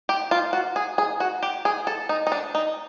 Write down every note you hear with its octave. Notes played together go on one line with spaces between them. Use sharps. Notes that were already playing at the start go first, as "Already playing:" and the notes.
G4
F4
F#4
G#4
G#4
F#4
G4
G#4
A4
D#4
D#4
D4
D#4